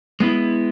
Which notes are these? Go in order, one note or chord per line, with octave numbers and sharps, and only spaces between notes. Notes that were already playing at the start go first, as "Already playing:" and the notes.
G#3 B3 E4